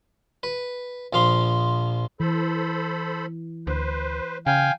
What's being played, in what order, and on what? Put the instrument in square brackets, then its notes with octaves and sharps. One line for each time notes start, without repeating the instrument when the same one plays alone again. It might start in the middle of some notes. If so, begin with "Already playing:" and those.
[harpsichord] B4
A#1 F3 F5 C6
[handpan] E3 [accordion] A4 C5 B5
[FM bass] D2 [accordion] B4 C5
[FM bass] C#3 [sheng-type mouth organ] F5 G5 G#5